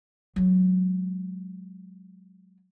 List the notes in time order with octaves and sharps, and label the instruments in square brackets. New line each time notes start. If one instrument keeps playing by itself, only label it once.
[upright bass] F#3 G#3